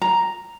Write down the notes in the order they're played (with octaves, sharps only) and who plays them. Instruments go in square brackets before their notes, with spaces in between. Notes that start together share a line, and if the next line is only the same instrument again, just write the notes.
[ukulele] A#5